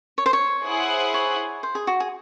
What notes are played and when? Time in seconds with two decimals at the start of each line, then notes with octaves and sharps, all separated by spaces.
0.18 C#5
0.26 C5
0.33 C#5
0.66 E4 G#4 C5 F#5
1.14 C#5
1.63 C5
1.75 G#4
1.87 F#4
2.00 G#4